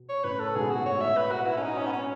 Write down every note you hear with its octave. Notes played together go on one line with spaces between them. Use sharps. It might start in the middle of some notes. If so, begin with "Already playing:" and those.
Already playing: B2
C#5
A2 C#3 B4
A4
G#2 B2 G#4
F#4
A2 C#5
E5
B4
F#4
E4
C#4
D#4
C#4
B3
C#4